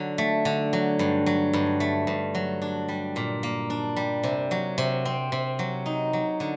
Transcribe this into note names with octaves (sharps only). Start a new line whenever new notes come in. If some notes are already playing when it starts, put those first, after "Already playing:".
Already playing: D3 F#3
A3
D3
F#3
G2
F#3
G2
A3
G2
F#3
D4
G3
A#2
A#3
D4
G3
C3
F#3
C3
C4
C3
F#3
D#4
F#3
D3